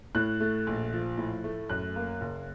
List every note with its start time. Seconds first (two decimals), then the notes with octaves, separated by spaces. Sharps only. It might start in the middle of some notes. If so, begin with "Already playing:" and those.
0.15 A2 F#6
0.40 A3
0.67 A#1
0.93 F3
1.18 A2
1.44 A3
1.69 F#2 F#6
1.96 A#3
2.21 F#1